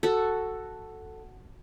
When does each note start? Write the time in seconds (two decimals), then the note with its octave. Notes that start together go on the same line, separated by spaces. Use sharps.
0.03 F#4 A4